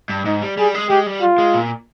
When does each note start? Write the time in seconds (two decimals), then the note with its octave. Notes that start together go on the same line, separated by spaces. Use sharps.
0.09 G2
0.25 G#2 D#4
0.42 G3
0.57 G3 G#4
0.74 G#3
0.90 G#3 G4
1.06 G3
1.22 F4
1.38 G#3
1.54 A#2